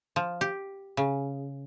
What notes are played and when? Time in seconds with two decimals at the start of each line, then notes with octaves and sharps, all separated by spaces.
0.16 F3
0.41 G4
0.97 C#3